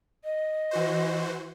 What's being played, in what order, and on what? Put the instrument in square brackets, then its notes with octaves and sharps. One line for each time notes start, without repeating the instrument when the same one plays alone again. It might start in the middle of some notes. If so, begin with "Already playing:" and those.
[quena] D#5
[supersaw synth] E3 F#4 C5